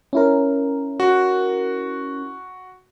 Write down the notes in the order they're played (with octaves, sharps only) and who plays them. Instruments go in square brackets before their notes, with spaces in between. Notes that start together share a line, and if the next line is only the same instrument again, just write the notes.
[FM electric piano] C#4 E4 A#4
[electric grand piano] F#4